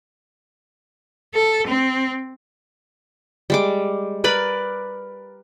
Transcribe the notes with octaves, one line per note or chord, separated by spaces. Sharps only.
A4
C4
G3 G#3 D6
A#4 B4 D5 B5